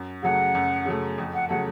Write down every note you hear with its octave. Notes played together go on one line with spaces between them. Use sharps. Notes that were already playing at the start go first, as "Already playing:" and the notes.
Already playing: F#2
C#3 F#3 A3 F#5
F#2
C#3 F#3 A3
F2
F#5
C#3 F#3 A3 F#5